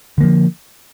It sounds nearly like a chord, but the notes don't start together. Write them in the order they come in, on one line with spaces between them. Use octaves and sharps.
D3 A#3 F3